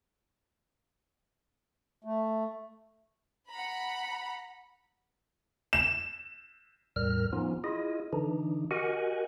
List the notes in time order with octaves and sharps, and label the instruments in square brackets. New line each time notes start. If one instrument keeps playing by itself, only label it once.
[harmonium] A3
[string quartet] F#5 A#5 [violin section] B5
[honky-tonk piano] E7
[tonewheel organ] E2 A2 G3 A#4 F6
F3 B3 C#4 D#4 F4
E4 F4 G#4 D#5
D3 E3 D4 D#4
F#4 G4 A#4 D#5 F#5 G#5